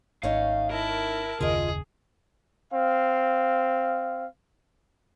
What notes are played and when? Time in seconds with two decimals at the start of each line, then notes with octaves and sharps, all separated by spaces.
0.23 G#1 A3 C#4 D#4 F5
0.71 E4 A#4 A5
1.40 F#1 D#2 C#3 F4 G#4 D#5
2.72 C4 F5